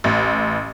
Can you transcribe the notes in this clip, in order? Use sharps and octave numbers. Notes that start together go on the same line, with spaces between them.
A1